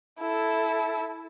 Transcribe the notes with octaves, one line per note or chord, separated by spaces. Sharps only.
E4 A4